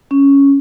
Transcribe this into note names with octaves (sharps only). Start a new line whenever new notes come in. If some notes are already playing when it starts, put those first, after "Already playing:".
C#4